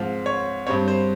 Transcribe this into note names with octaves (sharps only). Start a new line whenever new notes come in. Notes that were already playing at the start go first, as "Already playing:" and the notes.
Already playing: G#2 F3 C4 F5
C#5
G2 G3 C4 C#5
C5